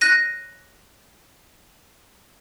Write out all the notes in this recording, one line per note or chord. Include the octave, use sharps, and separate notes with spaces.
F#6 A#6 D#7